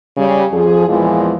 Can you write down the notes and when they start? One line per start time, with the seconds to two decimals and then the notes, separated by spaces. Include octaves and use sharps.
0.17 C#3 G3
0.53 F2 F3 G#4
0.88 E2 A#2 E3 F3 G#3 B3